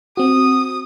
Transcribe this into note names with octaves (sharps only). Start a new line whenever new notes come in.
C4 F#4 D#6